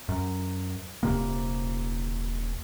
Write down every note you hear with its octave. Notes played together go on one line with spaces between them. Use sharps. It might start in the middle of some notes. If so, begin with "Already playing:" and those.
F#2
D#1 C3 A#3